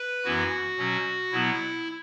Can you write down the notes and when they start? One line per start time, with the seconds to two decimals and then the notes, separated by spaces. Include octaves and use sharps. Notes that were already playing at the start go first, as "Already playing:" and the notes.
Already playing: B4
0.24 F#2 E3 B3 E4 F#4
0.78 B2 F#3 C#4
1.32 B2 F#3 B3 E4